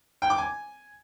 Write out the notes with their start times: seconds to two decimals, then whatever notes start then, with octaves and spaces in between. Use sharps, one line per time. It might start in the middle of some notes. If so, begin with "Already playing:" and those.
0.22 G5
0.30 D6
0.38 G#5